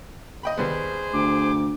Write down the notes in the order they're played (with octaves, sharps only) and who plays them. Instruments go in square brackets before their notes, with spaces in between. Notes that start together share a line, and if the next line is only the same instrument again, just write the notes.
[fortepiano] D#5 G5 B5
[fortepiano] D#2 G3 B3 [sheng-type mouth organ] G#4 C5
[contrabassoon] D2 [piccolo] D6